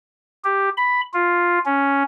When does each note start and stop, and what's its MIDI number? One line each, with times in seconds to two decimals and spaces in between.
0.44 0.69 67
0.77 1.01 83
1.14 1.59 65
1.66 2.03 61